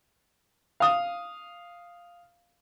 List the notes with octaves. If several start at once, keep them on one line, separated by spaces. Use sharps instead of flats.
F5 D#6